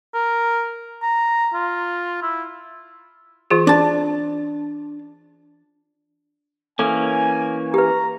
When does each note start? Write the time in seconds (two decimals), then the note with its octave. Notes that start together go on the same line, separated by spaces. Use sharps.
0.14 A#4
1.02 A#5
1.54 F4
2.22 E4
3.50 E3 F4 G#4
3.67 D4 A5
6.79 E3 A#3 C#4 A4 G#5
7.74 G4 B4 A#5